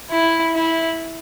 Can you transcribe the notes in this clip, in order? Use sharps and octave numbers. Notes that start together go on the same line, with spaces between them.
E4
E4